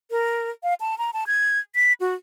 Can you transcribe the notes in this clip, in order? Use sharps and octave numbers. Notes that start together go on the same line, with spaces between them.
A#4
F5
A5
A#5
A5
G#6
B6
F#4